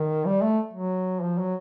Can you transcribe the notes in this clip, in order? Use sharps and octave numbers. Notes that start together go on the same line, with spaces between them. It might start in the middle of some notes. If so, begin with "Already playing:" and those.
Already playing: D#3
G3
A3
F#3
F3
F#3